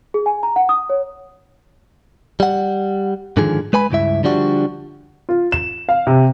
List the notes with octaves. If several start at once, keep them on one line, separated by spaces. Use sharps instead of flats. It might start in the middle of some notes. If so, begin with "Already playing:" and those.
G#4
G#5
A#5
F#5
D#6
C#5
G3 F#5
G#2 D3 D#3 F3 G#4
G#3 B4 G#5 B5
C#2 G2 E4 E5
D3 F3 G3 D4 F#4
F4
E7
F5
C3